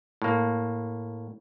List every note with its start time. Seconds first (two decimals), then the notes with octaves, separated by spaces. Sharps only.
0.22 A2 A#3